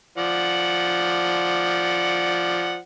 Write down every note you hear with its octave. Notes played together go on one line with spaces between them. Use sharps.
F3 D5 F#5